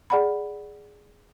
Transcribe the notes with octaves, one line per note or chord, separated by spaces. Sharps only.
G#4 D5 F#5 A#5 B5